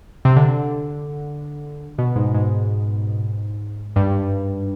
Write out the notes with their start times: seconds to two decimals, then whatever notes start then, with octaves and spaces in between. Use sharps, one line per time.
0.25 C3
0.36 D3
1.98 B2
2.16 G#2
2.34 G#2
3.96 G2